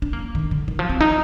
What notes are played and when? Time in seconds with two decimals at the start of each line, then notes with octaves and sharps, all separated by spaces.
0.02 D4
0.13 A#3
0.35 D#3
0.51 D3
0.68 D#3
0.79 F3
0.89 C4
1.01 D#4